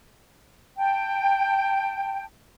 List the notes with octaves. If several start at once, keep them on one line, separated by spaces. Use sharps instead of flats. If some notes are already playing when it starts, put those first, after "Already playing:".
G5 A5